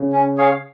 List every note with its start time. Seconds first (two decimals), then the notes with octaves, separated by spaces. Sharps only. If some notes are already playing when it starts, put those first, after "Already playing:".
Already playing: C#3
0.12 C#4
0.37 G#4 C#5 F5